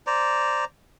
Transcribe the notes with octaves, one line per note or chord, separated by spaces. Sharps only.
C5 D5 A#5